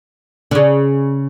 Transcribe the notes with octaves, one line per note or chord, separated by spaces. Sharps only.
D3
C#3